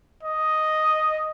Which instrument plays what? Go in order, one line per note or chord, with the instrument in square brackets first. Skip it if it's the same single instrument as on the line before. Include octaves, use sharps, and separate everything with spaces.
[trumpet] D#5